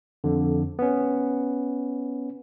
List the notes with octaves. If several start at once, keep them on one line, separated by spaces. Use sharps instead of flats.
F2 D3
B3 C#4